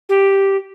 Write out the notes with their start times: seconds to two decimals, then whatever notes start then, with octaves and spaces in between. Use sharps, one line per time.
0.09 G4